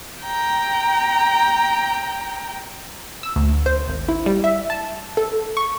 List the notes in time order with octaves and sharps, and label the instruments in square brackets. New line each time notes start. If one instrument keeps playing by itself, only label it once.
[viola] G5 A#5
[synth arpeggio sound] E6
D2
C5
G#1
E4
G3
E5
A5
A4
C#6